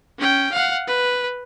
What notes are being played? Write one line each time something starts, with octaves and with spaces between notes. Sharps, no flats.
C#4 G5
F5 F#5
B4